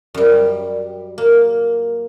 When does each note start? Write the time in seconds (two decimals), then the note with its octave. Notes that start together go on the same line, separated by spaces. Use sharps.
0.14 F#2 G3
1.18 A#3